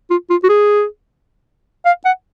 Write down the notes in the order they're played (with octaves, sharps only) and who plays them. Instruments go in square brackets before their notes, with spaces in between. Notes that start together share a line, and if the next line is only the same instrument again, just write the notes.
[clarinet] F4
F4
F#4
G#4
F5
F#5